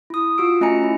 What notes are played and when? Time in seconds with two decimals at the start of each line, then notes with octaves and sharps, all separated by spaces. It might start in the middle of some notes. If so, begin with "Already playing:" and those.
0.10 E4 D#6
0.38 F4 F#4 E6 D7
0.61 A3 C#4 D#5 G#5 A#5 C#7
0.82 C#4 E4